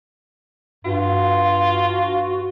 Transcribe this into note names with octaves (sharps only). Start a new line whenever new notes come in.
G2 F4 F#4